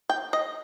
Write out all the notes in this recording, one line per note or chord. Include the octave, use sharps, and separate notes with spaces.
G5
D#5